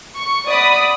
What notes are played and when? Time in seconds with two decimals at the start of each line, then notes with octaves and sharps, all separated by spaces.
0.15 C#6
0.48 D5 F#5 B5 D#6